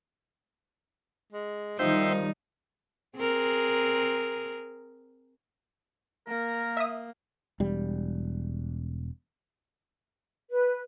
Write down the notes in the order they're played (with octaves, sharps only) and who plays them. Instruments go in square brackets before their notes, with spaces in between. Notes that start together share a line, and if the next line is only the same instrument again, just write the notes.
[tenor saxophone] G#3
[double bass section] D#3 G3 [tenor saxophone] F3 [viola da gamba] D#4 [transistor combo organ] C5 E5 G5
[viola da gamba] C4 G#4 A#4
[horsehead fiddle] A#3 [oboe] A#4
[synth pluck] E5 D#6
[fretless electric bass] E1 G3
[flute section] B4